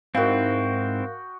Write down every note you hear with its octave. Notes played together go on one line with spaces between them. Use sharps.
G#2 C4 E4 F#4 A#4 D#5 F5 G5